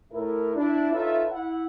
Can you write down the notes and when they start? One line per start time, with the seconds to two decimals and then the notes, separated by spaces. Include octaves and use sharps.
0.12 A2 E4 A#4
0.55 D4 E4
0.92 D#4 F4 A4 B4 C#5 E5
1.31 E4 F#5